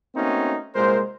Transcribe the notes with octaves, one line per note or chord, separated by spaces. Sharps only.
A3 A#3 C4 C#4 D#4 F#4
C2 A#2 G#3 A#4 C5